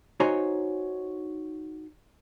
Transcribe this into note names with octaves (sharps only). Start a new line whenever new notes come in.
D#4 F#4 C5 C#5 G#5 A#5